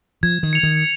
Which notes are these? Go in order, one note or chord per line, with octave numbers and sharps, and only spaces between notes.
F3 G#6
D#3
C#7 F7
D#3